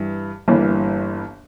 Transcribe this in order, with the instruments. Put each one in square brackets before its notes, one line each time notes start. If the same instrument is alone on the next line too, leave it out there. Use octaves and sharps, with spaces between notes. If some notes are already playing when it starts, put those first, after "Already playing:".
Already playing: [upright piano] G2 E3
G1 G2 E3 A#3